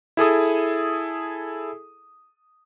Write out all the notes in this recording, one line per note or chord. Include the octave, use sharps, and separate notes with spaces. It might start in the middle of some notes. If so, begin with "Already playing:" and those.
E4 G#4 A4 D#6